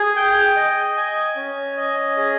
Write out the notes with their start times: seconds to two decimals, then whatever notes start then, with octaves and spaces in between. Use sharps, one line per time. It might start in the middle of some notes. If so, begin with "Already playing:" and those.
Already playing: G#4
0.16 G5
0.56 D#5
0.96 G#5
1.36 C#4
1.77 D#5
2.17 G#4